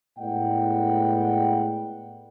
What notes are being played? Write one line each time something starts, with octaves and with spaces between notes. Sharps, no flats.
A2 G#3 B3 D5 F#5 G5